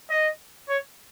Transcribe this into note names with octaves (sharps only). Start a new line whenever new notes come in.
D#5
C#5